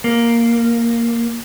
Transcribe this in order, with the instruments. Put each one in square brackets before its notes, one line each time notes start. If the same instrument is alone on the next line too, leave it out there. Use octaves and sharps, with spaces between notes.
[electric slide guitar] A#3